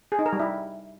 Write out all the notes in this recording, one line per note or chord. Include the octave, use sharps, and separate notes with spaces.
G#4
D#4
A#4
G3
E4